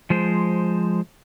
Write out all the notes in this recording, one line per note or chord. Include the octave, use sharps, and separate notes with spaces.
F3 G#3 C5